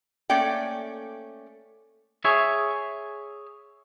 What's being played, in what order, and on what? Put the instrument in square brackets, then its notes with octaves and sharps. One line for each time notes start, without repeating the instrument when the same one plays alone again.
[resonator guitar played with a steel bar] A3 A#3 C#4 D5 G5
[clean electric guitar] G#4 C#5 E5